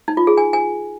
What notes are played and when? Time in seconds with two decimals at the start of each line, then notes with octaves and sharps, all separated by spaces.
0.08 D#4
0.17 F4
0.27 G#4
0.37 G#5
0.53 G#5